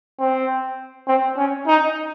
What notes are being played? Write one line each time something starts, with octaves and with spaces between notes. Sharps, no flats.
C4
C4
C#4
D#4